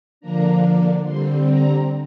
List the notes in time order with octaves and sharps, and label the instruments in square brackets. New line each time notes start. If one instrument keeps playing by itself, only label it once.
[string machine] D3 F3 A#3 D4 A#5
D3 G3 C4 C6
A#5